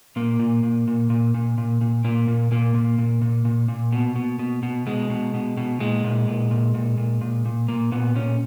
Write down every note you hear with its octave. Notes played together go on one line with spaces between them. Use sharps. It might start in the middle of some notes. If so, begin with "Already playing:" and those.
A#2 A#3
A#2
A#2
A#2
A#2
A#2
A#2
A#2
A#2 A#3
A#2
A#2 A#3
A#2
A#2
A#2
A#2
A#2
B2
B2
B2
B2
B2 G#3
B2
B2
B2
A#2 G#3
A#2
A#2
A#2
A#2
A#2
A#2
A#2
A#2 A#3
A#2 B3
A#2 C#4